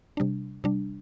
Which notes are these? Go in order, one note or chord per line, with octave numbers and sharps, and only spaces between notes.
C3 G3 D4
C3 G3 D4